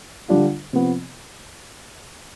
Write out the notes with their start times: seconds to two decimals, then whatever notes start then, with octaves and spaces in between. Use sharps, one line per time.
0.28 D3 G3 D4 F4
0.73 C3 F3 B3